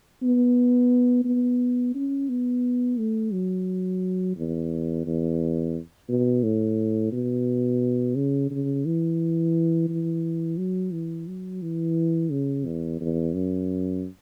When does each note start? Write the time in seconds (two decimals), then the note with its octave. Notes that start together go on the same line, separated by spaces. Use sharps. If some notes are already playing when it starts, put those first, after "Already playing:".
0.22 B3
1.25 B3
1.95 C#4
2.29 B3
2.99 A3
3.33 F#3
4.37 E2
5.06 E2
6.09 B2
6.43 A2
7.12 B2
8.16 C#3
8.50 C#3
8.85 E3
9.89 E3
10.57 F#3
10.92 E3
11.28 F#3
11.62 E3
12.31 C#3
12.66 E2
13.00 E2
13.34 F#2